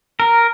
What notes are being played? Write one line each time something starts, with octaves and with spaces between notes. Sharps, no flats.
A#4